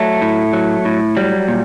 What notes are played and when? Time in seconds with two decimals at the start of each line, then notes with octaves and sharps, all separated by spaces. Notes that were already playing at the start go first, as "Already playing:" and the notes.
Already playing: F#3 A3
0.21 A2
0.53 F#3
0.85 A2
1.17 F#3 G3
1.48 A#2